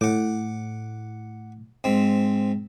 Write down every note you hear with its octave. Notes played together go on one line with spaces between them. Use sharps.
A2 F#5 D6
G#2 C4